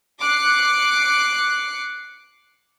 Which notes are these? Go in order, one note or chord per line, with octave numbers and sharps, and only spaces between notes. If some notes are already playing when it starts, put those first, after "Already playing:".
D6 F#6 C7 C#7